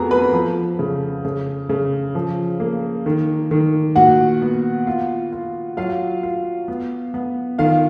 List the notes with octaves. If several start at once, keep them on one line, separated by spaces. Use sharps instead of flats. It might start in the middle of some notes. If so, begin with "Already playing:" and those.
Already playing: F2 B3 F#4 G#4 A#4 A#5
B4 B5
F3
C#3
C#3
C#3
F3
A#3
D#3
D#3
A#2 F#4 F#5
B3
F4
F4
F#3 F4 F5
F4
B3
B3
D#3 F4 F5